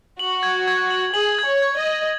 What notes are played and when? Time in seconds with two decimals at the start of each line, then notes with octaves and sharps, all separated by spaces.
0.19 F#4 F#7
0.43 G#6
0.68 G#6
0.90 F#7
1.14 G#4 F#7
1.39 G#6
1.46 C#5
1.62 G#6
1.77 D#5
1.86 F#7